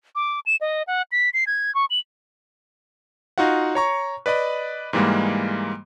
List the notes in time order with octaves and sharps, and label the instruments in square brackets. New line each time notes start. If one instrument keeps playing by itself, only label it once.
[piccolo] D6
E7
D#5
F#5
B6
C7
G#6
C#6
F#7
[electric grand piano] D#4 F4 F#4 F5 F#5
C#5 A#5 C#6
B4 D5 D#5 B5
G#2 E3 G3 G#3 A#3